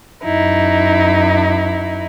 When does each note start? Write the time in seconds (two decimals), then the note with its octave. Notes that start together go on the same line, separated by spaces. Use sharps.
0.24 F#2 D#4 E4